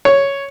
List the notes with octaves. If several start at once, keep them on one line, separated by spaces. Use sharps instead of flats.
C#5